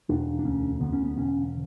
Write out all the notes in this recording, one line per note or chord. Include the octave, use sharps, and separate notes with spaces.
E1 D4
D4
D2 C#4
D3 B3
C#4
B3
E1 C#4